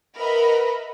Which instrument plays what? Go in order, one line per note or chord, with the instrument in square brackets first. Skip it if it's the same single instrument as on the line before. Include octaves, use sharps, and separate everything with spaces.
[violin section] A#4 B4 D#5 E5 F#5 B5